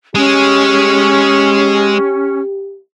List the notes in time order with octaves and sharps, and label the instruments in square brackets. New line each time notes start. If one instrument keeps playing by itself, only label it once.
[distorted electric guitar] G#3 G#4 [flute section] C#4 [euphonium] G4